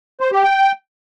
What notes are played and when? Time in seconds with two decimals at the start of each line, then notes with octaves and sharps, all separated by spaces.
0.21 C5
0.32 G4
0.43 G5